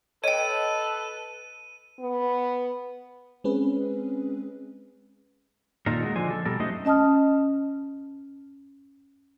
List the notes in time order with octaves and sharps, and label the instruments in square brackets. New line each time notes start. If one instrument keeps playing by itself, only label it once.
[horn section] A4 B4 [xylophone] C#5 G5 [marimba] D#5 [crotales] D#7
[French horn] B3
[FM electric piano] G#3 C4 C#4 G#4 B4
[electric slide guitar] A#2 D#3 D#4 F4 A4 A#4
G#3 F#4
D3 F3 C5 G#5
A4
B2 G3 A4 A#4
F#2 A3 D#4 F#4 C5 D#5
[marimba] C#4 D#5 A5 D#6 F6